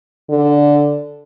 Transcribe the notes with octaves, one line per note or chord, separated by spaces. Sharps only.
D3